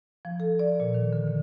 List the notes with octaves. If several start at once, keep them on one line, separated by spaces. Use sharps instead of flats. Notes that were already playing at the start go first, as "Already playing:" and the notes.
F3
A4
D5
A#2
D#3
D3
D3